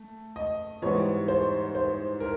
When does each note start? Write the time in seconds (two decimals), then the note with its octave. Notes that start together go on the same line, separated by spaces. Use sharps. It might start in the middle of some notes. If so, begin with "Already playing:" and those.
Already playing: A3
0.36 D#5
0.82 G#2 E3 G3 B3 C#5
1.28 C5
1.75 C5
2.20 A#4